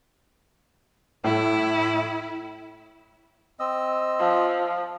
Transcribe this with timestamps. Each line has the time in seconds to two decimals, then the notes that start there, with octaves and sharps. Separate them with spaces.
1.24 A2 E4
3.60 C4 D#5 E6
4.20 F3